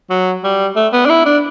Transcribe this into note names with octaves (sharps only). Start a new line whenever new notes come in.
F#3
G3
A3
B3
D4
E4
D4